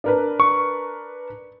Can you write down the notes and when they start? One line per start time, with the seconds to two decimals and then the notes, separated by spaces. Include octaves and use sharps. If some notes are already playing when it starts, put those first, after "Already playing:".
0.04 D4 A#4 B4
0.40 C#6